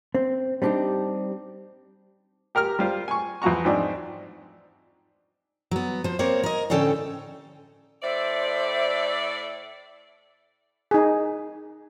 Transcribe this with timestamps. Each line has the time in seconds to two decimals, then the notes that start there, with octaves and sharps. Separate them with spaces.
0.15 C4
0.62 G3 C4 D4 D#4 G4
2.55 G4 A#4 A#5 F6
2.79 G3 F4 C5
3.08 G#5 C#6
3.42 E2 F3 F#4 A#5 C#6
3.65 G#2 F3 C4 D4
5.71 F#3 B3
6.04 F3 C5
6.19 A#3 C4 A#4 C#5
6.43 A#4 D#5
6.70 A2 D3 C#4 A4 G5
8.03 A2 A4 C5 D5 E5
10.91 D#4 G#4